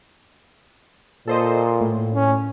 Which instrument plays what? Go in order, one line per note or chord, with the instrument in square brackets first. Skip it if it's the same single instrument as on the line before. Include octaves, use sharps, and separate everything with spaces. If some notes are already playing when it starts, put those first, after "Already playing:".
[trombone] A#2 [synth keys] A4 C5 D#5
[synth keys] A2
[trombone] C#4